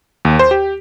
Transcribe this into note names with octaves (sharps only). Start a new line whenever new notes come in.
D#2
C5
G4